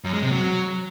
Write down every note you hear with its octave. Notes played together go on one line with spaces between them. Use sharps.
F#2
G#3
C3
F#3